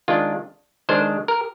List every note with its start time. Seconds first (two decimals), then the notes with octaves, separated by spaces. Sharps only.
0.08 D#3 G#3 D4 F4
0.89 D#3 G#3 D4 C5
1.28 A#4